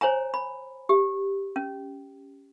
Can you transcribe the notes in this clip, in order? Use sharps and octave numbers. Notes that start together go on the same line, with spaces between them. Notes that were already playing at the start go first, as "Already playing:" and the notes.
C5 C#5 G#5 A#5
B5
G4
C#4